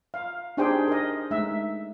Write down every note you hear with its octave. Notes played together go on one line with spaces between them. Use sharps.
F5
D4 D#4 G4 G#4 C5 G5
A#4 D#5
G#3 A3 D#4 E5